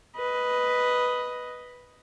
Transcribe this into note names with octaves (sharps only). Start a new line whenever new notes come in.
B4 D#5